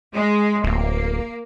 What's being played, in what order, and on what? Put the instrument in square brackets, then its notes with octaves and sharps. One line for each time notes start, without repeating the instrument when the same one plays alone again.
[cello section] G#3
[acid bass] D1 [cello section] A#3